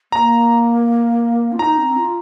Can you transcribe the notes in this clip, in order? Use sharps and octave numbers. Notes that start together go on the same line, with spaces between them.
A#3 A#5
F4
D#4 A#5
C4
F4